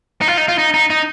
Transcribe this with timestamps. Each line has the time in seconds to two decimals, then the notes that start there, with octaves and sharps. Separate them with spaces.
0.21 D#4
0.28 F4
0.37 D#4
0.48 F4
0.58 D#4
0.74 D#4
0.90 D#4